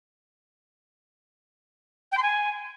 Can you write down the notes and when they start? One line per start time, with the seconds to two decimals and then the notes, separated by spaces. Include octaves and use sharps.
2.12 G5
2.17 C6
2.22 G#5